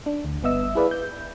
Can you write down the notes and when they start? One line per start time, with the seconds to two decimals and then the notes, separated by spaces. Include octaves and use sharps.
0.06 D4
0.25 D2
0.43 G1 G2 B3 D#5 E5 E6
0.75 E4 G#4 B4 D5 E5 F5
0.91 G6